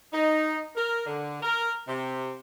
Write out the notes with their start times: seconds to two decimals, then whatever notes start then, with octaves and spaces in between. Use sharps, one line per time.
0.13 D#4
0.76 A#4
1.06 D3
1.43 A#4
1.88 C3